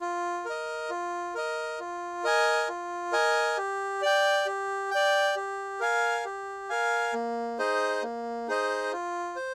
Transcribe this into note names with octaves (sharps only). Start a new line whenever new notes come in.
F4
A#4 D#5
F4
A#4 D#5
F4
A#4 D#5 G#5
F4
A#4 D#5 G#5
G4
D5 G5
G4
D5 G5
G4
A#4 F5 G#5
G4
A#4 F5 G#5
A#3
D#4 G#4 C5 D#5
A#3
D#4 G#4 C5 D#5
F4
C5